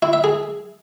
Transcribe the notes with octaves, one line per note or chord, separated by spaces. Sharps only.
E4
E5
G#4